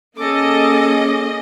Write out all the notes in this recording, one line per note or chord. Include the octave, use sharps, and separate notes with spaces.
A#3 C#4 G#4 A4 D#5 D6